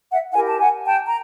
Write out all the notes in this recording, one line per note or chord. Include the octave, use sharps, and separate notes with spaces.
E5 F#5
E4 G4 A#4 F#5 G#5
A5
F#5 G#5
G5 A5
A#5